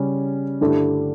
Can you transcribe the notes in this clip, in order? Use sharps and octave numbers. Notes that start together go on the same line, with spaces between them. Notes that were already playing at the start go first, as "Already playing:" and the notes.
Already playing: C#3 G3 C#4
G2 D3 A3 E4 G4